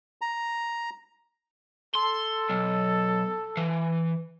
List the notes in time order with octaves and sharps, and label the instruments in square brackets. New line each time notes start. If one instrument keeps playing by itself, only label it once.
[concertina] A#5
[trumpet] A4 [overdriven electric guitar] C6
[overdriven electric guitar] B1
E3